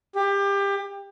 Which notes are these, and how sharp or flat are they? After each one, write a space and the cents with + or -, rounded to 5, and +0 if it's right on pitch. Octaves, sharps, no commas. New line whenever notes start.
G4 +25